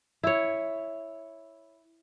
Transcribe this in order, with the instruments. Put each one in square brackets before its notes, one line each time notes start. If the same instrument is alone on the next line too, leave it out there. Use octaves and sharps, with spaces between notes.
[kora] E4 C#5